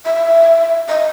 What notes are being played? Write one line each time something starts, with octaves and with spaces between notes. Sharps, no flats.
E5
D#5